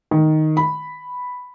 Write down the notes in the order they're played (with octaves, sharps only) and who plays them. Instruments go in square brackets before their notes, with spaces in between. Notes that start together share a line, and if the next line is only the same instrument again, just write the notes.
[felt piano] D#3
B5